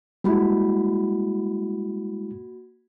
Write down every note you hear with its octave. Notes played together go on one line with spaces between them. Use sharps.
G3 G#3 A#3 E4 F#4 B5